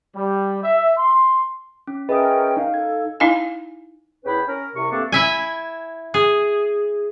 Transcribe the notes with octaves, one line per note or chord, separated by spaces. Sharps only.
G3
E5
C6
C#4
C#4 G#4 A#4 B4 D#5 E5 G5 D#6
D#4 F5
A4 G#6
D#4 E4 F5 G#5
E2 C#4 E4 B4 G5 B5
C#4 A#4
C2 C3 C#6
G2 A3 A#3 C4 D4
E4 E5 G#5
G#4